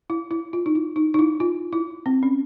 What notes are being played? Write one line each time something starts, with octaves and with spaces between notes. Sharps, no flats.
E4
E4
F4
D#4
E4
D#4
D#4
E4
F4
E4
C4
C#4